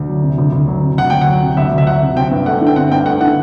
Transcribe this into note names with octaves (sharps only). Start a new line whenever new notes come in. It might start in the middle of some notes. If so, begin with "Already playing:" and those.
Already playing: D2
F#3
C3
D2
D2
F#3
C3
D2 F#5
D2 G5
F#5
F#3
C3
D2 E5
D2
E5
F#3 F#5
C3
C4 G5
G2
A3 F#5
D3
G5
C4 F#5
G2 G5
A3 F#5
D3 F#5